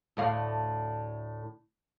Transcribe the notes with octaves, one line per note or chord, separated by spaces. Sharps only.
D2 A2 F5